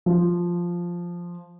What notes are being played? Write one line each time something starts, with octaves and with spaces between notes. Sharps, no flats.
F3